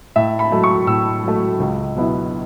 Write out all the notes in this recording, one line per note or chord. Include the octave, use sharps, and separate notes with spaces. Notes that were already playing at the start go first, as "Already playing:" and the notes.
A2 E5
B5
F#3 A3
C#6
A2 E6
F#3 A3
C#2
B2 F#3 B3 E4